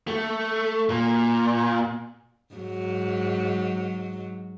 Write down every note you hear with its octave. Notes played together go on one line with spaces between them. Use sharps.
A3
A#2
G#2 F#3